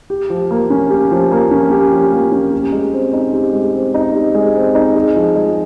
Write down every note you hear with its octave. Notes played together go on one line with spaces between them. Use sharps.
G4
F3
A#3
C#4
G4
F3
A#3
C#4
G4
F3
A#3
C#4
G4
G#3
C4
D#4
G4
G#3
C4
D#4
G4
G#3
C4
D#4
G#4
F3
G#3